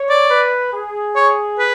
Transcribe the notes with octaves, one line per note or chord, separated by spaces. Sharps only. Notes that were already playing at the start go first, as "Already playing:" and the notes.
Already playing: C#5
D5
B4
G#4
C#5
B4